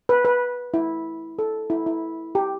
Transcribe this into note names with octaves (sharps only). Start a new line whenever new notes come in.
B4
B4
E4
A4
E4
E4
G4